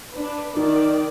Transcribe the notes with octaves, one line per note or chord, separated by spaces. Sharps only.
D4 B4
D#3 D#4 D5